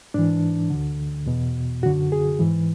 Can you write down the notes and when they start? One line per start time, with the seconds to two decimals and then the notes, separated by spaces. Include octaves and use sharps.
0.14 G#2 E3 D4
0.70 D2 D3
1.26 E2 B2
1.83 F#2 D3 F#4
2.12 G#4
2.39 G#2 E3